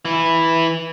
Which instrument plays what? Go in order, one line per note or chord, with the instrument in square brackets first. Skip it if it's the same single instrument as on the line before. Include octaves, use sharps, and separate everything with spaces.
[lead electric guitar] E3 E4